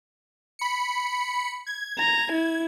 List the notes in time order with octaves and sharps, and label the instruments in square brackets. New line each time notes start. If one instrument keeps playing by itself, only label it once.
[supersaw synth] B5 C#7
G#6
[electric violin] A#5
E4